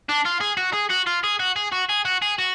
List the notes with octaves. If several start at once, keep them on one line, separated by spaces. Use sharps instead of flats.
D4
F4
G#4
F#4
G#4
F#4
F4
G#4
F#4
G#4
F#4
G#4
F#4
G#4
F#4